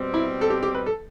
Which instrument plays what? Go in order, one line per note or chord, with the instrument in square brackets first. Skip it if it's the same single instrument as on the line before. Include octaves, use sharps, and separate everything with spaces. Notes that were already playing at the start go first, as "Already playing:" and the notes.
Already playing: [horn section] B2 G3 C4
[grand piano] E4
A4
G4
G4
B4
A4